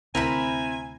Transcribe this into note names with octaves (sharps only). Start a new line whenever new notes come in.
D2 C3 C4 E4 A#4 E5 G#5 B5